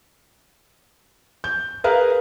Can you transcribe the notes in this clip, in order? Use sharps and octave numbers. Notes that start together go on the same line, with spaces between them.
G6
G#4 A#4 B4 F5